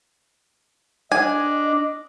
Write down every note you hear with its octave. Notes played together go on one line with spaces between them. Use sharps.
D4 D#5 G#5